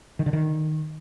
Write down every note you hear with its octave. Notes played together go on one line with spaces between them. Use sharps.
D#3
D3
D#3